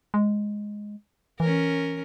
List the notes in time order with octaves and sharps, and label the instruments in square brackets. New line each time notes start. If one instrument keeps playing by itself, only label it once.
[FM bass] G#3
[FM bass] E3 [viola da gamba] C#4 A#4